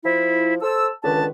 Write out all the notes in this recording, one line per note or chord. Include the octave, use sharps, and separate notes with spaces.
F3 E4
A4 C5 A5 E6
C#2 D3 D#3 B4 A5